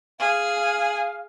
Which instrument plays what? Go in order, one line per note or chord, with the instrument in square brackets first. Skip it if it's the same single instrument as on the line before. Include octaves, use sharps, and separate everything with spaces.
[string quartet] G#4 [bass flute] F5